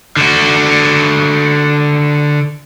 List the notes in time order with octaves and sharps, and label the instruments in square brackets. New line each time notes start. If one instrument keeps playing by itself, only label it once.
[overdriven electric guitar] D3 F#4